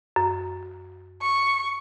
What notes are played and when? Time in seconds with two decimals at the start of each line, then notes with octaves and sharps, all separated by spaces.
0.16 F#2
1.22 C#6